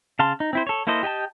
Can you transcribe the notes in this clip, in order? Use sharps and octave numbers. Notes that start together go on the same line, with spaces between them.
C#3 F5 A5 C6
D#4
C4 E4 C5
A4 C#5
A#3 E4 A4 C5 D#5
G4 D#5 G5 A5